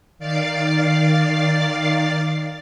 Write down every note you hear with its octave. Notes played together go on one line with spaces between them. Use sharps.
D#3 D5 F5 D6 A6 C7